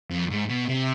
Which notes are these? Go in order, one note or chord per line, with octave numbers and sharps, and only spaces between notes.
F2
G#2
B2
C3